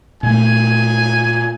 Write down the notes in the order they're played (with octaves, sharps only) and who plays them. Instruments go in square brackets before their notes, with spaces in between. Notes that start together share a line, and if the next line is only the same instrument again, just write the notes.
[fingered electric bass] A#2 A3 [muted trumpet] G#5